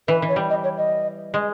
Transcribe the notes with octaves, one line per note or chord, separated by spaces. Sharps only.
E3 B4
E3
C#5
G3
D#5
C#5
D#5
G#3